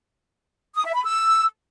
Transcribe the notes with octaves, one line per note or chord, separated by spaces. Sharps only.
D#6
E5
B5
E6